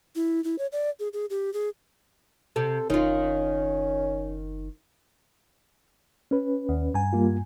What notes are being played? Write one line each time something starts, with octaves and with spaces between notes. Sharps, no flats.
E4
E4
C#5
D5
G#4
G#4
G4
G#4
C3 A4
F#1 D#3 C#4 D#4 F4
C#4 B4
D#2
G2 G#5
G3 A#3 F4